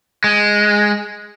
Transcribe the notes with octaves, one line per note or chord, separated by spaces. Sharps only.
G#3